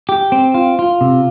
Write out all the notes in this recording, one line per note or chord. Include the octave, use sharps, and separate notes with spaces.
G4
C4
F4
F4
C3